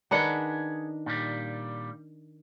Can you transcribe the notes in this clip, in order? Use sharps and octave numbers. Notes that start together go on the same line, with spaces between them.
D#3 D4 G#4 B4 F#5
A#2 G3